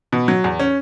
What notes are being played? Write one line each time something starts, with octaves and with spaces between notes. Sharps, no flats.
B2
F#3
E2
C#4